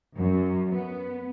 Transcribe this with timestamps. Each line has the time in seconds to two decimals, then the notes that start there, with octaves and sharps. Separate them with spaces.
0.17 F#2
0.75 B3